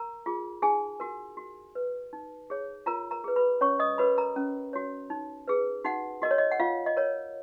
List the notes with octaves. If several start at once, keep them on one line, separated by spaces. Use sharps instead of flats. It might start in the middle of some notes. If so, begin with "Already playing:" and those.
Already playing: A#4 A#5
F4 G#4
D#4 G#4 G#5
F#4 A#4
F#4
B4
D#4
G#4 C#5
F4 A#4 A#5
A#4 A#5
G#4 B4
B4 B5
C#4 C#5 C#6
D#5 D#6
F#4 A#4 B4 C#5 B5
A#4 A#5
C#4
F#4 C#5
D#4
G#4 B4
D#4 F#4 F#5
F#4 A#4 D#5
C#5
D#5
F#5
F4 F5
D#5
A#4 C#5